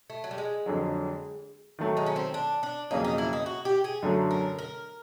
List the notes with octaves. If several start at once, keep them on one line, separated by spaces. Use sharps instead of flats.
A3
F#3
G3
G#3
F2 D3 F#3
D#3 F#3 A3
G#3
C#4
C4
D4
D4
F2 C#3 F#3 A#3 C#4 D#4
D#4
E4
D#4
F#4
G4
G#4
F#2 D3 F#3 A3
A#4
A#4